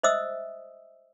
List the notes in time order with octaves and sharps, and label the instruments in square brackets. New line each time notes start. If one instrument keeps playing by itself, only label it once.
[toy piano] C5 D#5 E5 D#6 E6